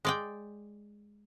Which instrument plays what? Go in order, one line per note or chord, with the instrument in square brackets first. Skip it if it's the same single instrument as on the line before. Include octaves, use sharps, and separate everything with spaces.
[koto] G#3 D5 G5